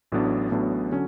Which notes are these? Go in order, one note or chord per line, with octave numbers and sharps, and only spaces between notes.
A1 A2 F#3 B3 D4
A1 A2 F#3 B3 D4
D3 F#3 C#4